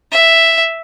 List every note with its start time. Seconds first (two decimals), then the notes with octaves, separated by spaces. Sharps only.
0.12 E5